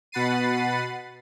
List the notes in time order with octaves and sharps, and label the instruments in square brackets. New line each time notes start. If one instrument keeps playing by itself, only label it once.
[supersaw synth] B2 F#5 B5 A6 C7 D#7